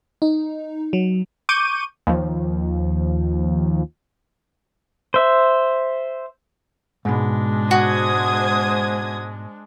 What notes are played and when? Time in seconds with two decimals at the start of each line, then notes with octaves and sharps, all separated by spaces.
0.22 D#4
0.93 F#3
1.49 C#6 D6 G6 D#7
2.07 D#2 F3
5.14 C5 E5
7.05 G#2 B2 G#3 D4
7.71 F#4 C5 D#6 G#6